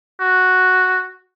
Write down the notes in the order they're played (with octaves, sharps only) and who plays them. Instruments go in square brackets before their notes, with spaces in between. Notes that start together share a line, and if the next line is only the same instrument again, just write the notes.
[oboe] F#4